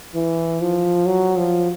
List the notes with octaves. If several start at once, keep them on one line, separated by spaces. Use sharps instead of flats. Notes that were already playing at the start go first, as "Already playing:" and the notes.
E3
F3
F#3
F3